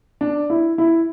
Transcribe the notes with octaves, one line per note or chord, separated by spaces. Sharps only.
D4
E4
E4